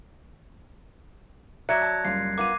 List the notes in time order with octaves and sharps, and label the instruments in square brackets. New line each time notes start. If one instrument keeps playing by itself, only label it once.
[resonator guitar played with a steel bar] F#3 D5 E5 [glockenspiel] F#6 G#6 A#6 [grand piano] C#7
[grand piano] A5
[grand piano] F#1 G3 [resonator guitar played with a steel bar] F4 [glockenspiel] C7
[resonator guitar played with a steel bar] A#3 B3 F4 [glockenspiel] D6 D#7